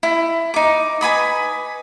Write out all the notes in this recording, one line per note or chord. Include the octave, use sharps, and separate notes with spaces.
E4
D#4 D6
B4 G#5 B5 D#6